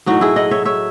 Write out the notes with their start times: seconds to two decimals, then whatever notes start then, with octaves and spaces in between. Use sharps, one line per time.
0.06 A2 F#3 D#4 F#4
0.21 E4 G#4
0.36 D#5 F#5
0.51 C#5 E5
0.65 C#5 E5